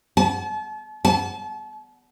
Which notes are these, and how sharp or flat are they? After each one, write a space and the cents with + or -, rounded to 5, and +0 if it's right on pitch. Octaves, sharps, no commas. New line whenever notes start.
A5 -35
A5 -35